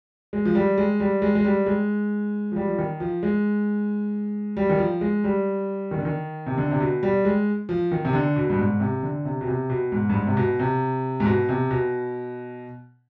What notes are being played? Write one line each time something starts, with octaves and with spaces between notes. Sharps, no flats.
G#3
F3
G3
G#3
G3
G#3
G#3
G3
G#3
F3
G3
F3
D#3
F3
G#3
G3
D#3
F3
G#3
G3
D#3
D3
D#3
C3
D3
C3
B2
G3
G#3
F3
D#3
C3
D3
B2
G2
G#2
C3
D3
C3
B2
C3
B2
G#2
G2
G#2
C3
B2
C3
G#2
B2
C3
B2